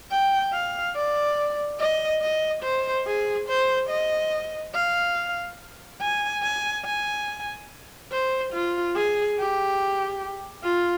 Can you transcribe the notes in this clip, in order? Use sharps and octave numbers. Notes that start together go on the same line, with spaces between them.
G5
F5
D5
D#5
D#5
C5
G#4
C5
D#5
F5
G#5
G#5
G#5
C5
F4
G#4
G4
F4